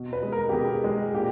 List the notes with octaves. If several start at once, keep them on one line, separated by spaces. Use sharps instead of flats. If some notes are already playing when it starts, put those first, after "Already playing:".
Already playing: B2
B4
G#3
A#4
G4
B2 G#4
G#3
A#2 G4